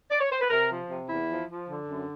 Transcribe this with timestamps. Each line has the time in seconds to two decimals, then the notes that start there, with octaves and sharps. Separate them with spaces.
0.10 D5
0.20 C#5
0.30 C5
0.40 B4
0.50 C3 A#4
0.70 F3
0.89 C3
1.09 E2 E4
1.29 F3
1.48 F3
1.68 D3
1.89 F#2